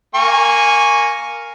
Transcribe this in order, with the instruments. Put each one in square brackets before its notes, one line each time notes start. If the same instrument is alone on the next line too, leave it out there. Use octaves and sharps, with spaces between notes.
[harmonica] A#3 G#5 C#6